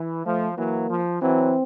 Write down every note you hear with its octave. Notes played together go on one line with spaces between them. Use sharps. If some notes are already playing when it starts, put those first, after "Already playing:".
Already playing: E3
F3 A3
E3 F#3 A#3
F3
E3 F#3 C4